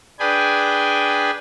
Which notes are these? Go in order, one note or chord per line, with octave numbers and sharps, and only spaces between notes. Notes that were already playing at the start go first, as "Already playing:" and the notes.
D4 G#4 B4 G5 G#5